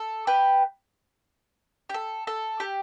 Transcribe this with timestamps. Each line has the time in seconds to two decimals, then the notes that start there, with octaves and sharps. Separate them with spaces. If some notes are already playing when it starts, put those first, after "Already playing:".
Already playing: A4
0.27 G4 B4
1.89 G4
1.94 A4
2.27 A4
2.60 G4